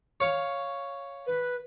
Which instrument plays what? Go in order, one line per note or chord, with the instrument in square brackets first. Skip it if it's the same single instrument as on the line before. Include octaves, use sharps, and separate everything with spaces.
[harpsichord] C#5 F5 C#6
[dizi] B4